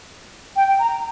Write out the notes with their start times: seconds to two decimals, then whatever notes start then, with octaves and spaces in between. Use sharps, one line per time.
0.56 G5
0.79 A#5